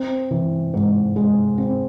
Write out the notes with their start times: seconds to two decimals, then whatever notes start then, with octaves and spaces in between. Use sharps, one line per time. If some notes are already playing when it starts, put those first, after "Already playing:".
Already playing: C4
0.31 E3
0.74 G#2
1.16 G#3
1.58 C4